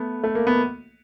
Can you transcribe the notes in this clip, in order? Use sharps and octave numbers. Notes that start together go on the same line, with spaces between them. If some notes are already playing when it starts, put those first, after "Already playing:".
Already playing: A3 B3
A3
A#3
B3